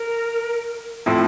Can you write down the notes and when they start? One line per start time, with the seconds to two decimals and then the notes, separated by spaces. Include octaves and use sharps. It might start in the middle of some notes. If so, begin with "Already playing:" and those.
Already playing: A#4
1.06 A2 F3 C4 E4 A4